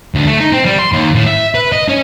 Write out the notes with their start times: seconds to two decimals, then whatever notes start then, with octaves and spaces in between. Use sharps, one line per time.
0.15 D2
0.26 A3
0.40 D#4
0.52 C4
0.66 G3
0.79 C6
0.93 D#2
1.14 A2
1.27 E5
1.55 B4
1.72 D#5
1.88 C#4